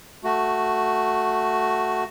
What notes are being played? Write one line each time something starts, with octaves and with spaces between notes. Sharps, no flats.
A3 F#4